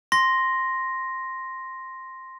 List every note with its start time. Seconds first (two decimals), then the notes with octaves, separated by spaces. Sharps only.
0.12 C6 A#6